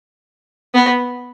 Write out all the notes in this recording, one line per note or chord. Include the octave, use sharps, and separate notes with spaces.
B3